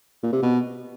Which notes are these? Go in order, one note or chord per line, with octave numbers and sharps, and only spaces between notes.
A#2
C3
B2